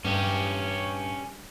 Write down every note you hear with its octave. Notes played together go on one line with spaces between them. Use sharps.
G2 C#4 G4